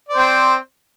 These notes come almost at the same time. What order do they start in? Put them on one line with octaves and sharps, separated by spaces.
D5 C5 C4